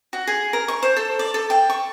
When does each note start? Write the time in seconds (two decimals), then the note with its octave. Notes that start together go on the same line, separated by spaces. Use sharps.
0.13 F#4
0.27 G#4
0.53 A#4
0.68 C#6
0.83 C5
0.96 A4
1.19 D5
1.34 A4
1.50 G5
1.70 C#6